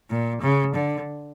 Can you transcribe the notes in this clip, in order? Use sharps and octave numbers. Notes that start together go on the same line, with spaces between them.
A#2
C#3
D3